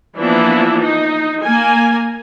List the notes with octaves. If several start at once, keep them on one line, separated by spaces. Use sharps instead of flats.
E3 F3 A#3 B3 D4 E4
D#4
A#3 A#4 G#5